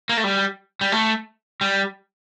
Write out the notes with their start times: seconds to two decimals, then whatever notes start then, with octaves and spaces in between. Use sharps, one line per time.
0.09 A#3
0.17 A3
0.24 G3
0.81 G3
0.92 A3
1.61 G3